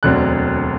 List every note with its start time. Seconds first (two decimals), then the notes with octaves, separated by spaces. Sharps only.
0.03 E1 D2 D3 F#3 C4 F#6